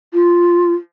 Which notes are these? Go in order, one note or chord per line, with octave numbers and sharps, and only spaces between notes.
F4